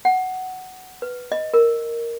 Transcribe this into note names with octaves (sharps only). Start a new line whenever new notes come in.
F#5
B4
D#5
A#4